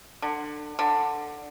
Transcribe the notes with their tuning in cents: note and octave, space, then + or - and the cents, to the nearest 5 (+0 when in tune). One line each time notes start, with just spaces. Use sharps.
D3 +25
D3 +10